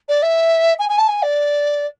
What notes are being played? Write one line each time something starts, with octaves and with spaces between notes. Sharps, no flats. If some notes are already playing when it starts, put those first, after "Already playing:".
D5
E5
G#5
G#5
A5
G#5
D5